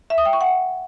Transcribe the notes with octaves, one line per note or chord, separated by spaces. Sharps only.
E5
D#6
G5
C#6
F#5